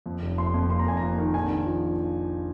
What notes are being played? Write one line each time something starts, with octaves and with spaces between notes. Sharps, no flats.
F2
F1
F2 C6
F2
A#3 C6
A#5
F1 G#5
A#5
F2
D#3
A#1 G#5
A#1
F3